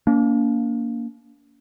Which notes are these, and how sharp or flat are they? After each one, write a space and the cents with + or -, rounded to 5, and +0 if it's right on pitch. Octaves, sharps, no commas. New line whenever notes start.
A#3 +0 D4 -45